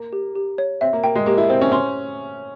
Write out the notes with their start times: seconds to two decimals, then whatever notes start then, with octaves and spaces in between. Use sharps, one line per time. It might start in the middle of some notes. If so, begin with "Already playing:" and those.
Already playing: A#3
0.13 G4
0.36 G4
0.58 C#5
0.81 C4 E5
0.93 A#3
1.04 A#3 G5
1.15 G#3
1.26 A#3 G4
1.38 E4
1.50 C4 C5
1.61 C#4
1.72 C#4 C6